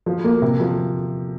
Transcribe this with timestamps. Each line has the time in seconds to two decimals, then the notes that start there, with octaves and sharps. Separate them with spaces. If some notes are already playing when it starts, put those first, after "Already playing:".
0.06 F3
0.24 A#3
0.42 C3
0.60 F3